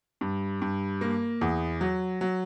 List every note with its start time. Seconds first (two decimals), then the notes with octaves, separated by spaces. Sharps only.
0.21 G2
0.62 G2
1.01 A#3
1.41 E2
1.81 F#3
2.21 F#3